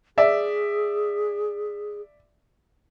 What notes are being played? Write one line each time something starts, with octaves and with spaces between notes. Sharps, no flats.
G#4 D5 E5